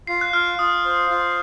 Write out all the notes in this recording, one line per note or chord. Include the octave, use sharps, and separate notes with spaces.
F4 C7
F#6
F4 F6
F4 D#6
C5
F4